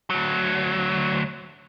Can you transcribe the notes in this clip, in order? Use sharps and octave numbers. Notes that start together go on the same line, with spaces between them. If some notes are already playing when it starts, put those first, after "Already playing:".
D2 F#3